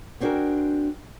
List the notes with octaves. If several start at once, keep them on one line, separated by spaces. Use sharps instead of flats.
B3 C4 D4 F#4 G#4 A#4